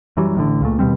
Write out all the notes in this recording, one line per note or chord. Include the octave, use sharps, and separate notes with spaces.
F#2 E3 F#3 G3
A1 A2 D3
C#2 A#2 A3
D#2 B2 G3 C4